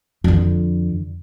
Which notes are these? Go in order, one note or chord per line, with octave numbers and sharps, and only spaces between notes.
F2 D3